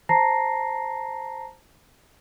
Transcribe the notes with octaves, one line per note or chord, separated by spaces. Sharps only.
C5 A5 A#5 A#6 C7